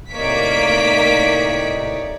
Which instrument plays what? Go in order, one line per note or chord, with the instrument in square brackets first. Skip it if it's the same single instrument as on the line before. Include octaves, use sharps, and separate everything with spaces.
[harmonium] A2 C3 D#4 [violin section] A#3 B6 D7 [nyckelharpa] C#5 D5